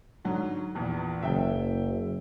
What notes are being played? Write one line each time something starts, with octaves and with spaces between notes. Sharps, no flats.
G#2 D3 F#3
A#1 E2
F#1 E5 G5